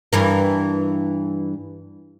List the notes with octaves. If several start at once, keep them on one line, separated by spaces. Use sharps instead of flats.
G2 E3 A#4